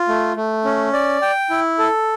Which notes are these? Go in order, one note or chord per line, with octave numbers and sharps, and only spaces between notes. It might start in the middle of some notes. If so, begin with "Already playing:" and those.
Already playing: F4
A3
A3
C#4
D5
G5
E4
A4